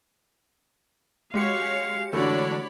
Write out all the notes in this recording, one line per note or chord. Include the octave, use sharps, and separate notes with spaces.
G#3 F#4 G4 C#5 F5 C#7
D3 E3 A3 D4 F#4 C#5 D5 B5